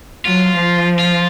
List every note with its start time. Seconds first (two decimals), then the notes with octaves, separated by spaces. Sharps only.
0.25 F#3 F4
0.54 F3
0.99 F4